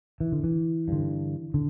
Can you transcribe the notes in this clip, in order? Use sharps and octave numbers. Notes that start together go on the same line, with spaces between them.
E3
D3
E3
G2 D3
D3